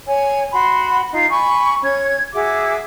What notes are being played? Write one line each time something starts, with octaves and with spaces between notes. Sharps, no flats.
C#5 G#5
F#4 B5 C6
D#4 F4
G#5 B5 C#6
C#4 C#5 G#6
F#4 G#4 E5 D6